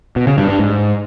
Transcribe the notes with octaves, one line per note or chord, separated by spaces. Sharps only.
B2
C#3
G2
G2
G#2